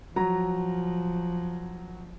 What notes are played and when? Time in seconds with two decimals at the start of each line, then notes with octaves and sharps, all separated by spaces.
0.16 F3 F#3 A#5